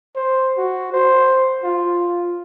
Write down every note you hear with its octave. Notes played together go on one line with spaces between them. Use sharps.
C5
F#4
C5
F4